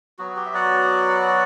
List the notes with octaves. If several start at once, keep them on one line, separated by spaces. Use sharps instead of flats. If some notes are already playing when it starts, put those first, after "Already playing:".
F#3 B3 F#4
G4
E5
D5 F#5